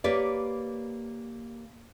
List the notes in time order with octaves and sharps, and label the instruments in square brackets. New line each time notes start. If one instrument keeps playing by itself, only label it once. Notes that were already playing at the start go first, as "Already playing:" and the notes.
[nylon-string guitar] A#3 G4 B4 C#5 D5